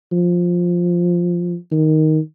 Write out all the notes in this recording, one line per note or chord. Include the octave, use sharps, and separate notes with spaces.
F3
D#3